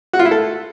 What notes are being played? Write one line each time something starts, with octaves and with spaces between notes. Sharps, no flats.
F#4
F4
E4
A4